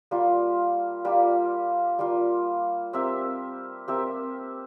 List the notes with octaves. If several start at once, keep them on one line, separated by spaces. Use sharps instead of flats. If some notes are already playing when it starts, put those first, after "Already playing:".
G3 A#3 F4
G3 A#3 F4
G3 A#3 F4
C4 G4 A#4 E5
C4 G4 A#4 E5